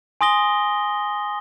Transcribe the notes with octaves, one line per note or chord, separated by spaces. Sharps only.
G#5 C6 D#6 A#6 G7